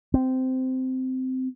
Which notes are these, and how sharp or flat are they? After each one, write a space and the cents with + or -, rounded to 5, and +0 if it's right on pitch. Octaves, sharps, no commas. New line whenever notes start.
C4 -15